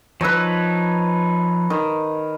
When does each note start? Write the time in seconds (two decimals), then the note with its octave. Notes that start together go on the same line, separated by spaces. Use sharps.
0.21 F3 D#4 B4 C#5 E6
1.70 D#3